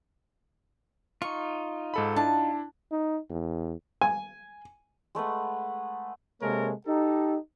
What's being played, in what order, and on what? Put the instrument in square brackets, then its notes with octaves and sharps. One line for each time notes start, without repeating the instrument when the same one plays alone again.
[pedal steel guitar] D#4 F4 [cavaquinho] C#6
[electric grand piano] G#2 A4 B5
[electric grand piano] D4 E4 [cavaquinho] A5
[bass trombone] D#4
E2
[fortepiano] G#5
[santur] G#3 A3 B4 F#5
[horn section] C3 G#3 A#3 A4 A#4 C#5
D#4 G4 A4